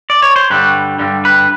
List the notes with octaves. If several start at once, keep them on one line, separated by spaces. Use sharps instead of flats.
D5
C#5
C5
G2 D3 G3 B4
G2 D3 G3
B4